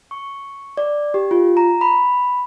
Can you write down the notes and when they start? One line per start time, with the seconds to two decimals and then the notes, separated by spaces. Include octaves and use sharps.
0.11 C#6
0.77 D5
1.14 G4
1.31 F4
1.57 A#5
1.81 B5